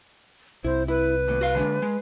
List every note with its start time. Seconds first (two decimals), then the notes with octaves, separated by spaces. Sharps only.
0.64 C2 C3 E4 C5
0.88 E4 B4
1.28 D#2 A2
1.41 F#4 F5
1.55 D3 G#3 D4
1.82 G#3